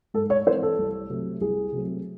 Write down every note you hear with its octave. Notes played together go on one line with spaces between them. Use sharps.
G#2 A4
C#5
E3 C4 C5
A4
C2
C3 F#3 A3 C4
C2 G#4
C3 F#3 A3 C4